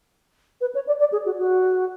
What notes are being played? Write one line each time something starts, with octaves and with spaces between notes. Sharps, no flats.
B4
C#5
D5
D5
G#4
F#4
F#4